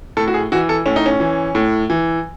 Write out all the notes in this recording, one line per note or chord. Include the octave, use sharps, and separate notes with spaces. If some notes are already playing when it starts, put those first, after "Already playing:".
A2 A4
F#4
G#4
E3 F#4
A4
A2 C#4
D#4
C#4
E3
A2
E3